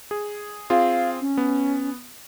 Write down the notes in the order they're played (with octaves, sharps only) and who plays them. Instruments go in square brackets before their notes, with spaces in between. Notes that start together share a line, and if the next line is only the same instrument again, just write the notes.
[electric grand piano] G#4
[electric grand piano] C4 F4 G#4 [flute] F5
[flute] C#4
[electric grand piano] B3